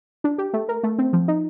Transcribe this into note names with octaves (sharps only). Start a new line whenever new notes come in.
D4
G4
A3
A#4
A3
C4
F3
D#4